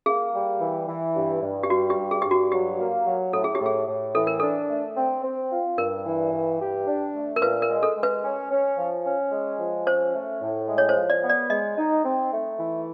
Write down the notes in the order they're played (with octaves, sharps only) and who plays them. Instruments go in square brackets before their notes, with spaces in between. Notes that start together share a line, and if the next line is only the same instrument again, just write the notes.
[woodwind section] A#3 [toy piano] G#4
[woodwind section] G3
E3
E3
G2
G2
[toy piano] G4
[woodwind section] G3 [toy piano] F#4
[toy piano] G4
[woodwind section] G2
[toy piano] G#4
[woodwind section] G2 [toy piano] G4
[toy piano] F#4
[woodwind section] F#3 [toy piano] G4
[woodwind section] A#3
F#3
[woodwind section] A2 [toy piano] A4
[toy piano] G#4
G4
[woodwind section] A2
[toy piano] G#4
[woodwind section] A2
[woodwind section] E3 [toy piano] A4
[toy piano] A#4
[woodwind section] D4 [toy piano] A4
[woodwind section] A3
C4
C4
F4
[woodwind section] G2 [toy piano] A#4
[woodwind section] E3
G2
G4
D4
A3
[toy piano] A#4
[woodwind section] A#2 [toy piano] B4
[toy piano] A#4
[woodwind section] G#3
[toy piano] A4
[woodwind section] G#3
[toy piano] B4
[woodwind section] C#4
C#4
F3
C#4
G#3
F3
[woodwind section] C#4 [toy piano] C5
[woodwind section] A3
A2
G#3
[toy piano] C#5
C5
[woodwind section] F3
[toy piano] D5
[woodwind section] B3
[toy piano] D5
[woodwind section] G#3 [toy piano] D#5
[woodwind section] D#4
C4
A3
E3